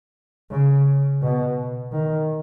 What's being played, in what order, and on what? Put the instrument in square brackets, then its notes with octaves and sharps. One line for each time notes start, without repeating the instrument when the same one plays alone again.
[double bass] C#3
B2
D#3